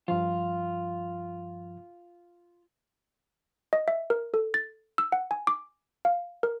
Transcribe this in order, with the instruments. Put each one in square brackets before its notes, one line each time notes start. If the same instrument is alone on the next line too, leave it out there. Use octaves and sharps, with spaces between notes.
[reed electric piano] G2 F3 [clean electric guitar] F4
[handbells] D#5
E5
A#4
A4
A6
E6
F#5
G#5
D6
F5
A#4